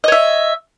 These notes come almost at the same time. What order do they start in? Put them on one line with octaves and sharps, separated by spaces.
D#5 C#5 E5